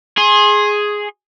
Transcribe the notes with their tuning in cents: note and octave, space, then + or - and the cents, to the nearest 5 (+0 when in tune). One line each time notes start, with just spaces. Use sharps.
G#4 +0 C6 +30